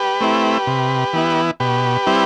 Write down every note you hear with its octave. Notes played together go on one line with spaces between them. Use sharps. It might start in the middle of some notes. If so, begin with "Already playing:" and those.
Already playing: G4 B4
A3 C4 E4
C3
E3 B3 E4
B2 G4 B4
G3 C4 E4